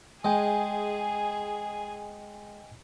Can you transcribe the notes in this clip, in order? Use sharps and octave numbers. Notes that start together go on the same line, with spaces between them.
G#3 G#4 D#5 G5 G#5